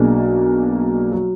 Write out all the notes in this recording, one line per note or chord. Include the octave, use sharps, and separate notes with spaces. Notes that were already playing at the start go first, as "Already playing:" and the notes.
Already playing: B1 B2 A#3 D4 G#4
F#3